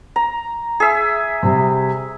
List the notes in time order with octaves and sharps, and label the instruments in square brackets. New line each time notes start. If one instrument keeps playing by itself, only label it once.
[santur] A#5
G#4 E5
[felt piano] C3 G3